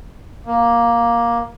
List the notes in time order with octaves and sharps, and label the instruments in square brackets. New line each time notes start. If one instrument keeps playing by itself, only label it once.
[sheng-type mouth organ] A#3